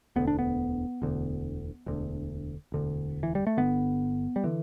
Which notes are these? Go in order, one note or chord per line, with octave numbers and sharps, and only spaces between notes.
E1 D2 D3 B3
D4
B3
E1 D2 D3
E1 D2 D3
E1 D2 D3
E3
G3
A3
G1 G2 D3 B3
G3
D3 E3